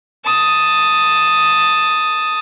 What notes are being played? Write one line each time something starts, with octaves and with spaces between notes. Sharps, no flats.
A5 D#6